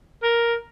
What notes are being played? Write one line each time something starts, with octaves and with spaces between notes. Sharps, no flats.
A#4